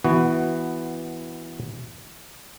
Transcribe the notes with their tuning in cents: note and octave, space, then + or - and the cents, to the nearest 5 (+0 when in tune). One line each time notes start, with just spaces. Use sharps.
E3 +0 B3 +0 F#4 +15